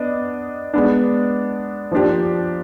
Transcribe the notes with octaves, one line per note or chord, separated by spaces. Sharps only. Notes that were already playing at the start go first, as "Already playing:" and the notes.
Already playing: B3 D4 D#5
G#3 B3 D4
F3 A#3 D4 G4